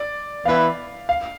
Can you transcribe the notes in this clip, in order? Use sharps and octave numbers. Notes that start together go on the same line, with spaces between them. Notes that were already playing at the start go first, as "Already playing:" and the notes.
Already playing: D5
E3 B3 E4 B4 F5
F5